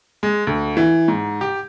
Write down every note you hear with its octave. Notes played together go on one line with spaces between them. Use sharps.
G#3
D2
E3
G#2
G4